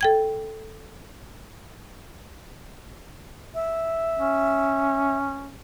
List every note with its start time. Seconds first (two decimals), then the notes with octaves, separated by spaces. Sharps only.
0.01 A4 G5 G#6
3.54 E5
4.18 C#4